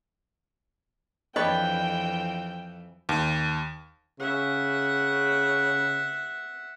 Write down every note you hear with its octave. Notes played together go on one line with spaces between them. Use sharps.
F2 E3 D4 B4 C#5 D#5 G5
D#2
C#3 E5 F#5